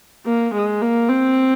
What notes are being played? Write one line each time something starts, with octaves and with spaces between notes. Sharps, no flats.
A#3
G#3
A#3
C4